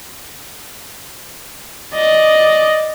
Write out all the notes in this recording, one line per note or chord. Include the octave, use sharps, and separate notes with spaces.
D5 D#5